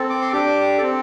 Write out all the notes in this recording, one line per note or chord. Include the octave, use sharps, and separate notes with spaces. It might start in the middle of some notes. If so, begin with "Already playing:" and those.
Already playing: C4 A4
D6
C6
D4 G4 D6
C4 A4